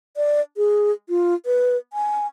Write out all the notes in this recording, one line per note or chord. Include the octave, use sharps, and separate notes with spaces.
D5
G#4
F4
B4
G#5